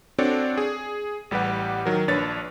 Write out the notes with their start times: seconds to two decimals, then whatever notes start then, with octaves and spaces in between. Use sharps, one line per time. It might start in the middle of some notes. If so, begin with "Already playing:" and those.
0.18 C4 D4 F#4 A4 C#5 D5
0.58 G#4
1.31 A1 G3 G4 B4 F#5
1.85 D#3 F#3 A#4
2.08 A#1 D4 B4 C#5 A6